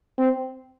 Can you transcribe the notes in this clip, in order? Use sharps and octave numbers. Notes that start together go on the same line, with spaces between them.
C4